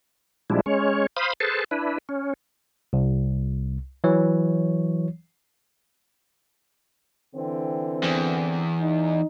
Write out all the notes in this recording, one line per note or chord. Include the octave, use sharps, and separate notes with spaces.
A#2 F3 G3 G#3 D4 E4
G#3 C#4 C#5
C5 F5 B5 D#6
G#4 A4 B4 C5 A5
D4 E4 B4
C#4
C2
E3 F#3 C#5
D3 E3 C4
E2
D#4